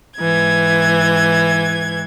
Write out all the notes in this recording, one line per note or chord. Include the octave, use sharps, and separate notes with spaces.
G#2 E3 G#6